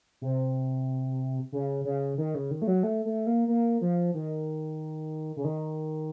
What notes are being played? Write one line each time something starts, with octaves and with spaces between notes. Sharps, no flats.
C3
C#3
C#3
D#3
C#3
D#3
A3
F#3
A3
A3
A#3
A#3
F3
D#3
C#3
D#3